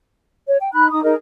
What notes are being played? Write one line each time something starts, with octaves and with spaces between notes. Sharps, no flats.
C#5
G5
D#4 B5 F#6
D#4 D#6
D#4 G#4 A#4 D#5